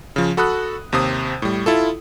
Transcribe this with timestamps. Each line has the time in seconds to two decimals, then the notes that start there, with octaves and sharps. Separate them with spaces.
0.16 C#3 F3
0.37 F#4 A4 B5 D#6 F#6
0.92 D#2 C3 C5 D#6
1.42 A2 G3
1.66 E4 F4 A4